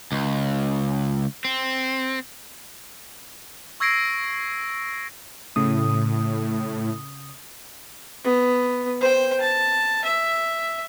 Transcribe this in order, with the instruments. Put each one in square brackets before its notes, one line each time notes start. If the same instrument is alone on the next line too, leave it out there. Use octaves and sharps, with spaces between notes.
[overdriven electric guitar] C#2
C4
[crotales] C#6 E6 G#6 A#6 C7 D7
[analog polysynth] A2 [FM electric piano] C#3 D#6
[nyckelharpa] B3
C5 G5
A5
E5